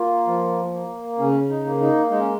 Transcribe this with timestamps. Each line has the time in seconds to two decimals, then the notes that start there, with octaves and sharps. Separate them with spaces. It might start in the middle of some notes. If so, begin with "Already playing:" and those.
Already playing: A#3 F4
0.27 F3
0.73 A#3
1.18 C#3 C#4
1.50 D#4
1.65 A#3
1.81 D#4
2.11 G#3 D#4
2.19 C#4